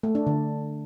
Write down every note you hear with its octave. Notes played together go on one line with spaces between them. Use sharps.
A3
D4
D3